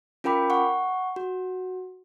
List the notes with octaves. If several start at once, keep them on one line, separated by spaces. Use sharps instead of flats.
C#4 F4 A#4 G5 B5 D6
F#5 C#6
F#4